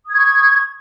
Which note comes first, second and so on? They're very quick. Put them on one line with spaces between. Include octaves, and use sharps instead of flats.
D#6 G#6 C#6